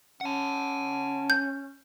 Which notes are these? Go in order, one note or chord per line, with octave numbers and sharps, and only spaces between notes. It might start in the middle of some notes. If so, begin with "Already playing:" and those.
C#4 F#5 A5
G6